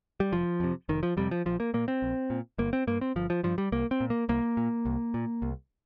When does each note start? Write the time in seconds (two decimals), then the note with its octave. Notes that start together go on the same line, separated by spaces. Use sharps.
0.20 G3
0.32 F1 F3
0.60 F2 C3
0.89 F1 D#3
1.03 F3
1.17 F2 C3 G3
1.31 F3
1.45 A#1 F3
1.60 A#3
1.74 A#2 A#3
1.88 C4
2.02 A#1
2.30 A#2
2.58 G1 A#3
2.73 C4
2.87 G2 A#3
3.01 C4
3.16 G1 F3
3.30 F3
3.43 G2 F3
3.58 G3
3.72 C2 A#3
3.91 C4
4.00 A#2
4.10 A#3
4.29 C2 A#3
4.57 A#2
4.85 C2
5.14 A#2
5.42 C2